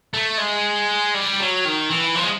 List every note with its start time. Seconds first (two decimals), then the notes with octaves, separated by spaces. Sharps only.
0.13 A3
0.38 G#3
1.14 G3
1.40 F#3
1.65 D#3
1.91 E3
2.15 F3
2.23 G#3